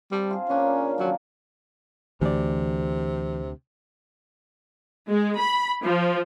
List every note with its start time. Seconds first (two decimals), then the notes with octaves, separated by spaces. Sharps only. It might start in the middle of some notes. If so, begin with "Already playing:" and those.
0.11 G3 C4 A5
0.31 F4 G#4
0.49 C#3 A#3 C#4 D4
0.99 D#3 F3 F#3
2.21 D2 C3 E3 D5
5.09 G#3
5.38 B5
5.84 F3